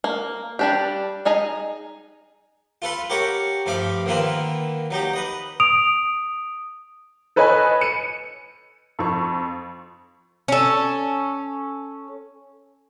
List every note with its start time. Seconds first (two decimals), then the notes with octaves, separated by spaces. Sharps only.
0.04 A#3
0.59 G3 D4 G4
1.25 D#4 G#4 D#5 A#5
2.82 F4 A4 B4 C6
3.10 G4 A4 A#4 C#5 F#5
3.66 G2 F3 A3 F5 D6
4.06 D3 D#3 A#3 F4 B4
4.91 F#3 D#4 G4
5.13 B4 D#5
5.60 D#6 D7 F7
7.36 A4 B4 C#5 D#5 G#5 B5
7.81 C#7 D#7
8.99 F2 C#6
10.48 C#4 A4